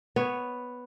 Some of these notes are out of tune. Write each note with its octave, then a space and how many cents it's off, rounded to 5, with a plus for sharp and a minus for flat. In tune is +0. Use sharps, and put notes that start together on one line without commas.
B3 +0 C#5 +0